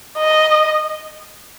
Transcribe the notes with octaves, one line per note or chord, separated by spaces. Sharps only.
D#5